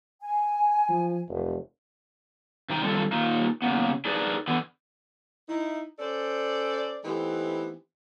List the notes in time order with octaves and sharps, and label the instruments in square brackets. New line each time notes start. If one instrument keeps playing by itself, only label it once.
[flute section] G#5
[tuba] F3
F1
[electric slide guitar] C3 D#4 G5
D3 D#3 G3 C4 F4 A4
A#3 D#4 F4
C#3 A#3 B3
D4 D#4 G#4 A#4 B4 D5
D3 E3 B3
[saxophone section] D#4 E4
C#4 A4 C5 D5
E3 A3 B3 C4 D#4 G4